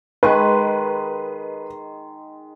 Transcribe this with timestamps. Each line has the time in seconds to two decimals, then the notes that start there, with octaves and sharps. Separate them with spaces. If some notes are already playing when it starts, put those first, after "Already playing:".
0.23 D#3 G#3 B4 C#6